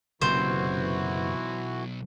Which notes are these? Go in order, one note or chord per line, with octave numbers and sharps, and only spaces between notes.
F#1 B1 F#2 C3 E3 E4 F#4 C5